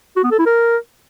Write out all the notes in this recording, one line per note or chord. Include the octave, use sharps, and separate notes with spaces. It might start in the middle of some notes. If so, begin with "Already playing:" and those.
F#4
B3
A4
E4
A#4